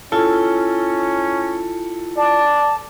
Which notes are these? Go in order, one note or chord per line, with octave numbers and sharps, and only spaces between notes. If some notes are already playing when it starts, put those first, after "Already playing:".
C#4 E4 F4 A4
D5 A5